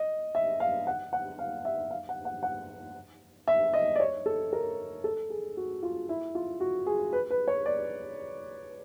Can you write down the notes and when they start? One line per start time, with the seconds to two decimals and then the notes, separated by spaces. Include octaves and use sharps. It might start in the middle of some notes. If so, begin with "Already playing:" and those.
Already playing: D#5
0.35 E5
0.60 F5
0.87 F#5
1.13 F#5
1.39 F5
1.65 E5
1.91 F5
2.09 F#5
2.25 F#5
2.43 F#5
3.48 E5
3.74 D#5
3.96 D5
4.00 C#5
4.26 A4
4.53 A#4
5.04 A4
5.30 G#4
5.57 F#4
5.83 F4
6.09 E4
6.35 F4
6.60 F#4
6.86 G#4
7.13 B4
7.30 B4
7.48 C#5
7.66 D5